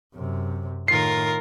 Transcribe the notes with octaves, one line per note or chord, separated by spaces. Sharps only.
F#2 C3
A2 D#3 F4 A#4 C7